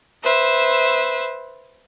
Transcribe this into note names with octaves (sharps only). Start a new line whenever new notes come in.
B4 C5 E5